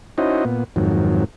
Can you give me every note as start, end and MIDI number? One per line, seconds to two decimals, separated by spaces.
0.18 0.44 61
0.18 0.44 63
0.18 0.44 64
0.18 0.44 66
0.18 0.44 72
0.18 0.44 75
0.45 0.64 46
0.45 0.64 59
0.76 1.24 41
0.76 1.24 44
0.76 1.24 51
0.76 1.24 54